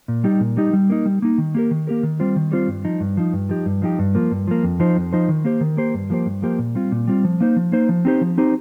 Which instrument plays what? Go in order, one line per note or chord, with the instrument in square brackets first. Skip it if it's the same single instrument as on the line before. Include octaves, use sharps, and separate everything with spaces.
[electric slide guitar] A#2
G3 D#4 G4
A#2
G3 D#4 G4
G3
A#3 D#4
G3
A#3 D#4
D#3
A#3 G4 A#4
D#3
A#3 G4 A#4
D#3
G3 C4 F4 C5
D#3
G3 C4 F4 C5
G2
F3 D#4
G2
F3 D#4
G2
F3 D#4 G4
G2
F3 D#4 G4
G2
F3 A#3
G2
F3 A#3
F2
F3 D#4 C5
F2
F3 D#4 C5
D#3
A#3 G4 C5
D#3
A#3 G4 C5
G2
F3 A#3 G4 C5
G2
F3 A#3 G4 C5
A#2
G3 C4 F4
A#2
G3 C4 F4
F3
A#3 D#4 C5
F3
A#3 D#4 C5
F3
C4 D#4 G4 C5
F3
C4 D#4 G4 C5